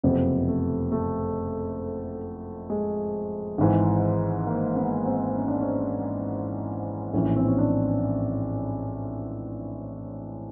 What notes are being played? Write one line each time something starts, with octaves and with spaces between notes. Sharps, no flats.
F#1 F2 C3 B3
A3
A3
G#3
G#1 G#2 E3
A#3
B3
C4
C#4
D4
C#4
A#1 A2 E3 C#4
C4
C#4
D4